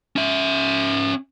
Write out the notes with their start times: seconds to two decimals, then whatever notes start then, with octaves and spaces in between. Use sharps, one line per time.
0.16 C#4 E5